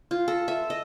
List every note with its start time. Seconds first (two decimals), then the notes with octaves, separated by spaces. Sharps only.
0.11 F4
0.28 A4
0.48 E5
0.70 D#5